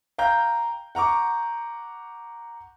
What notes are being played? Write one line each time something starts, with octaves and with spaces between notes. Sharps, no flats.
F5 G5 A#5 G6
F#5 A#5 C#6 D6